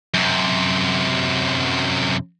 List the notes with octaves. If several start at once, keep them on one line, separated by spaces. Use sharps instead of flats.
F#2 C3